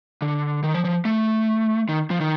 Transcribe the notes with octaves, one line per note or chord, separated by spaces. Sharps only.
D3
D#3
F3
F3
A3
D#3
F3
D#3